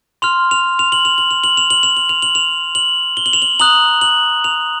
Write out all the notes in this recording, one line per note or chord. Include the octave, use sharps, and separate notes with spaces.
C6 F6 F7
F7
F7
F#7
F7
F#7
F7
F#7
F7
F#7
F7
F#7
F7
F#7
F7
F#7
G7
F#7
F7
F#7
A#5 D#6 F#6 F#7
F#7
F7